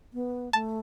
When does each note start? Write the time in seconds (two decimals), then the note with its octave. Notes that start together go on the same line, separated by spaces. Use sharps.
0.14 B3
0.53 A3 A5